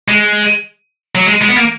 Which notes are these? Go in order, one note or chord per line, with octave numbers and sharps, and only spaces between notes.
G#3
F#3
G#3
G#3
B3
A#3